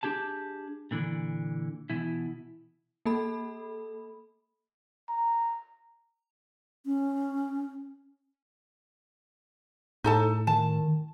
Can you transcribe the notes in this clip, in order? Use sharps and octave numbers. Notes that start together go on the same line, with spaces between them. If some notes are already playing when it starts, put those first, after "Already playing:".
D4 G4 G#4 A5
A#2 D3 E3
B2 E3 E4
A#3 A4 B5
A#5
C#4
A2 D#4 A4 A5
D#3 A5